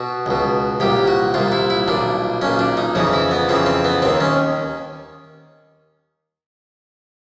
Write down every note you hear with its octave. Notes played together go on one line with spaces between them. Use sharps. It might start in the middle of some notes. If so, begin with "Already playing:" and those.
Already playing: B2 F#4
C#2 B2
C2 A#2 G4
F#4
C2 A#2 F4
E4
E4
B1 A#2 D4
B1 A#2 C#4
D4
D#4
F2 C#3 E3 D#4
E4
B3
F2 C#3 E3 C4
C4
B3
D#2 D#3 C4
C#4